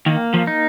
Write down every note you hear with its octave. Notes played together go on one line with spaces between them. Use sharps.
D#3 A#3
F3
D#4